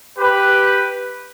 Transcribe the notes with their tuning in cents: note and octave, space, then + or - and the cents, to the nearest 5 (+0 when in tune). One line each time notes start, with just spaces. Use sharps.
G4 +0 B4 +0